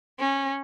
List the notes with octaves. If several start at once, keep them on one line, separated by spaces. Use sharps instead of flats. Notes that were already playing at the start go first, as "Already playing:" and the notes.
C#4